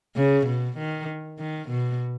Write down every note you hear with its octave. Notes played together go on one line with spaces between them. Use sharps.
C#3
B2
D#3
D#3
B2